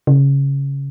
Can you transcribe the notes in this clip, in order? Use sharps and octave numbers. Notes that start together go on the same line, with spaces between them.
C#3